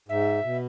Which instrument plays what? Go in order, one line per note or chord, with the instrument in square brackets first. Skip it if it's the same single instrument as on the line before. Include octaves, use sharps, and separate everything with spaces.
[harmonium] G#2 [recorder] E5
[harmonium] B2